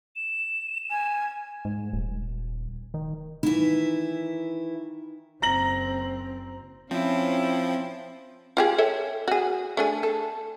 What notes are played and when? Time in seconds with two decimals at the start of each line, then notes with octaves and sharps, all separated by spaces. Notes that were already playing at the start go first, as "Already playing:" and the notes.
0.16 E7
0.91 G#5
1.65 G#2
1.93 D#1
2.94 D#3
3.43 D#3 E3 E4
5.42 F#1 C4 A#5 A#6 F#7
6.91 F3 C4 C#4 E4 F4
8.57 F4 G4 G#4
8.78 A4 C#5 E5
9.28 F#4 G#4
9.77 A3 D4 G#4
10.03 A4